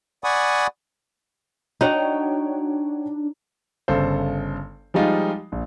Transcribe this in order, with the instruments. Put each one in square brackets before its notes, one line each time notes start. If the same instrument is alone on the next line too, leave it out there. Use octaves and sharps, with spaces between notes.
[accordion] D5 F#5 G#5 B5 C#6 D#6
[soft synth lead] D4 [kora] D#4 F#5 [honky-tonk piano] F#4 C#5 G5
[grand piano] G1 C#3 A4 C5
F3 G3 G#3 D#4 F4
A#1